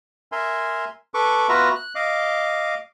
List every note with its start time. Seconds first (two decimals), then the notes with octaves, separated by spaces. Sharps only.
0.32 A#4 E5 G#5 C6
1.14 A4 B4 C#6 D6
1.49 B3 F4 F#4 B4 E5 A#5
1.75 F#6
1.95 D#5 F5 D6